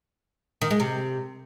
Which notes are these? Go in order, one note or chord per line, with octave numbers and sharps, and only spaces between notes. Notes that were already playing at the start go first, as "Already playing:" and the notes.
D#3
G#3
C3